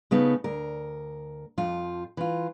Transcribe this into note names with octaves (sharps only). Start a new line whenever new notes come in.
C#3 A3 B3 D#4
D2 A#4
F2 F3 F4
E3 F4